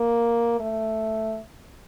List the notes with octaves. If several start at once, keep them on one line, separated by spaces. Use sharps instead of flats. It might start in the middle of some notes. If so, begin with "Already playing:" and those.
Already playing: A#3
A3